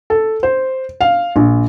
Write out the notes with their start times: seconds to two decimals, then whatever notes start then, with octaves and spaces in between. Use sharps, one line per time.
0.10 A4
0.43 C5
1.01 F5
1.36 A#1